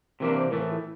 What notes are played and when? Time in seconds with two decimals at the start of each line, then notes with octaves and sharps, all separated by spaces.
0.20 C3 E3 G3 A#3 D4 A#4
0.36 C5
0.51 A2 E3 A3 A#4
0.61 A#4
0.72 E4